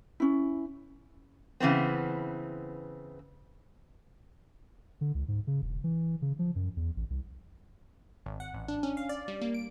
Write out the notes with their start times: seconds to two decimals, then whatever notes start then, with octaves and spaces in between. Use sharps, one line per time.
0.20 C#4 E4
1.60 C#3 E3 B3 C4
5.01 D3
5.15 C#2
5.28 G#2
5.47 C#3
5.62 E1
5.84 E3
6.22 C#3
6.39 F3
6.56 F#2
6.77 E2
6.97 A1
7.10 C2
8.26 G#1
8.40 F#5
8.54 A1
8.68 D4
8.83 C#4
8.97 F5
9.09 D5
9.28 G3
9.41 A#3
9.54 D7